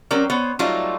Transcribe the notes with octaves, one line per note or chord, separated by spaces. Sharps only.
F#3 C4 C#4 G4 A#4 D5
B3 C5 C#5
F#3 G3 A3 C4 D#4 F4